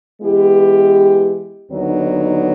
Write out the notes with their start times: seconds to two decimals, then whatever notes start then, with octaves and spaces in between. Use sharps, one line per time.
0.22 E3 G#3 B3 E4 G4
1.71 D#2 D3 F#3 B3 D#4